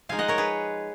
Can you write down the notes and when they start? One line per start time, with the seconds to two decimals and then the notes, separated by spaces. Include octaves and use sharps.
0.09 F3 G#3 D#4 F5 G#5
0.19 D#5 F#5
0.28 A#4 C#5
0.38 G#4 B4